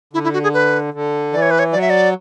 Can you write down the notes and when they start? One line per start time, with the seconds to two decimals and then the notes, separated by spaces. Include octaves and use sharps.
0.13 D3 E4
0.24 E4
0.34 F#4
0.43 G#4
0.54 B4
0.94 D3
1.33 E3 D5
1.42 C#5
1.51 B4
1.59 C#5
1.72 F#3 D5
1.81 E5
1.90 D5